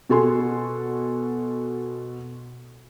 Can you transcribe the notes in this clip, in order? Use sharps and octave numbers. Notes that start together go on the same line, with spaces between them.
B2 F#4 A4 G#5 C6